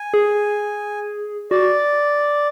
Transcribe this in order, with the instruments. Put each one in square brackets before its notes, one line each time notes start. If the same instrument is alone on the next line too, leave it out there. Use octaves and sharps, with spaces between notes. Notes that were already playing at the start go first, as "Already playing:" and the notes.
Already playing: [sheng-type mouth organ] G#5
[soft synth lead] G#4
[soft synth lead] F#4 [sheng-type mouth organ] D5